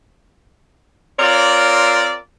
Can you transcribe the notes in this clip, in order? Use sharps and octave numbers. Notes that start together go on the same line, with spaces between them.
C4 F4 A#4 C#5 D5